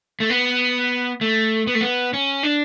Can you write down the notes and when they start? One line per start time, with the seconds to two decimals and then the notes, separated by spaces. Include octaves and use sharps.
0.20 A3
0.30 B3
1.21 A3
1.67 B3
1.75 A3
1.81 B3
2.14 C#4
2.43 D4